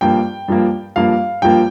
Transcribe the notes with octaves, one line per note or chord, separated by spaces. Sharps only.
G2 F3 A#3 G5
G2 F3 A#3
G2 F3 A#3 F5
G2 F3 A#3 G5